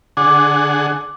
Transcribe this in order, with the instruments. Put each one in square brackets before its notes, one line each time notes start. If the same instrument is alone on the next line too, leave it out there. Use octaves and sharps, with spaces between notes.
[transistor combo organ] D3 G#4 F#5 [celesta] D6